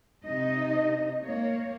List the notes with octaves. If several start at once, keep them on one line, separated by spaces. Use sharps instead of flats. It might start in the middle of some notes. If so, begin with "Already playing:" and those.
C3 D#4 D#5
A#3 C#5